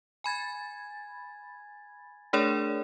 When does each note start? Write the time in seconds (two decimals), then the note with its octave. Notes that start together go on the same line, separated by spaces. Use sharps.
0.24 G#5 B5 G#6 A6
2.33 A3 D4 G#4 A#4 C#5 D5